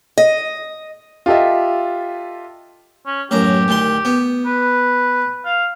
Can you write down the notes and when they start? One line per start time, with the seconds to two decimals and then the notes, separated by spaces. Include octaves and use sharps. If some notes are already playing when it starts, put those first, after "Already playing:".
0.18 D#5
1.26 F4 G4 A4 D#5 E5
3.06 C#4
3.31 A1 F#2 G4 A#5
3.68 D2 D#3 C6
4.05 B3
4.46 B4
5.45 F5